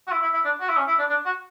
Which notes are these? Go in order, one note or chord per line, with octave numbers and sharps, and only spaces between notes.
F#4
E4
E4
E4
D4
F#4
E4
C#4
E4
D4
D4
F#4